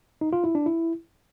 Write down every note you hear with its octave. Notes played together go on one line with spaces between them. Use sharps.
D#4
F4
E4
D4
E4